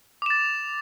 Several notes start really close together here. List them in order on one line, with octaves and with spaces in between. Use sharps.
D6 E7 A6